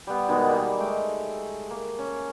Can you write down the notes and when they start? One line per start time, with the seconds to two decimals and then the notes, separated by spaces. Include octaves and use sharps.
0.07 G3 B3
0.28 B2 D#3 G#3 B3
0.49 G3 A#3
0.78 G#3 A3 G5
1.70 A#3
1.99 C#4